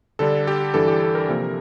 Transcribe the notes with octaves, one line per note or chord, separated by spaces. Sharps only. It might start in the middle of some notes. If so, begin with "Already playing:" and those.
D3 G3 D4 A4
G4
G2 E3 G3 D4 A4
G4
A4
A#4
C3 F3 A#3